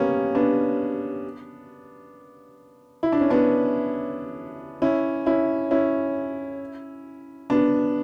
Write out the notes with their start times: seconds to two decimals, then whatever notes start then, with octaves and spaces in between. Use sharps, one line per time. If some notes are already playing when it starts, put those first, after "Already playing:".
Already playing: G3 A#3 B3 C#4
0.35 B3 D4
3.03 E4
3.12 D4
3.21 C#4
3.30 B3 D4
4.82 C#4 E4
5.26 C#4 E4
5.71 C#4 E4
7.50 B3 D4